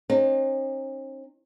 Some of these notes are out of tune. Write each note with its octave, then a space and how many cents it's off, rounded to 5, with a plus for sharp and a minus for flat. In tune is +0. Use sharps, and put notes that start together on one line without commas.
C4 +45 D#4 -40